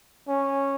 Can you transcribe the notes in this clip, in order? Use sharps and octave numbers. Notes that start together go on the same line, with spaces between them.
C#4